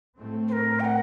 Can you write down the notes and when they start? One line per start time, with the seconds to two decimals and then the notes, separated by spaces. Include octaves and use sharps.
0.16 A2 A3 C4
0.48 C5
0.53 A#4
0.80 G5
0.85 F#5